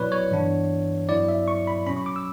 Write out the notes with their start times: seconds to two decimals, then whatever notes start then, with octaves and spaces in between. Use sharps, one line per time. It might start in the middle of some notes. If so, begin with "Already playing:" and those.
Already playing: B2 F#3 B3 E4 B4 C#5 D5
0.12 C#5
0.31 G2 E3 B3 D4
1.09 G2 F#3 B3 E4 D5
1.28 E5
1.48 C#6
1.67 B5
1.87 B2 F#3 C#4 B5
1.97 C#6
2.06 D6
2.16 E6